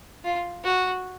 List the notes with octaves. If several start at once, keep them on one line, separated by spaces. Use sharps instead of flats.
F4
F#4